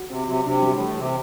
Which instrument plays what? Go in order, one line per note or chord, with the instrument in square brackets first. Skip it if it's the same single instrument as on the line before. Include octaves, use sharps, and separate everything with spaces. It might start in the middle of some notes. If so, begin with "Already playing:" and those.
Already playing: [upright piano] F#4
[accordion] C3 [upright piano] C4
[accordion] C3 [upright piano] F#3
[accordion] C3 [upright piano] D4
[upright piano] G3
[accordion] A2
[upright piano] E3
[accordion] C3 [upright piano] G4